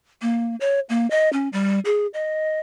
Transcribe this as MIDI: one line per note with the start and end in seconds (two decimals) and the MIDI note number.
0.22 0.56 58
0.61 0.80 73
0.89 1.09 58
1.10 1.31 75
1.33 1.49 61
1.53 1.79 55
1.85 2.07 68
2.14 2.59 75